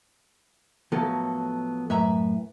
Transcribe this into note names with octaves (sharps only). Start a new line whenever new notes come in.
A2 F3 F#3 A#3 B3 A4
F#2 A2 B4 E5 A#5